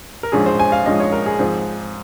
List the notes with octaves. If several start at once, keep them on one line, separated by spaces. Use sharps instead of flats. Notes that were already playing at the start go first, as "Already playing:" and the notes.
A#4
A#1 G#2 F3 G#3 C#4 G#4
C5
G#5
F5
A#1 G#2 F3 G#3 C#4 D#5
C#5
A#4
G#4
G#2 F3 C4